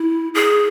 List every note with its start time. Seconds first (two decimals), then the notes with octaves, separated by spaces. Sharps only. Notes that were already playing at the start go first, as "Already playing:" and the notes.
Already playing: E4
0.35 G#4